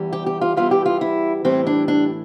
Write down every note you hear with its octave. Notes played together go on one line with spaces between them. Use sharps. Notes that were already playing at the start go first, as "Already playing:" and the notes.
Already playing: E2 E3 G3
G4
G4
F4
E2 E3 G3 F4
G4
F4
E4
A2 E3 G3 C4
D4
D4